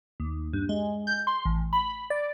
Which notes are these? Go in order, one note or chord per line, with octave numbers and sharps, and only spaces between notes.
D#2
G2
G#3
G6
C6
A1
B5
D5